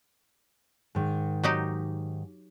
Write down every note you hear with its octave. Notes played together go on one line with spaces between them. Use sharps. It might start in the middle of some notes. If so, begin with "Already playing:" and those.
G#2 D#3
F#3 D#4 G4